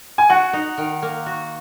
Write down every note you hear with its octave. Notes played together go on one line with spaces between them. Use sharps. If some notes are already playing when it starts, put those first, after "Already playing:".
G#5
F#4 F#5
D#4
D#3
A#3
F#4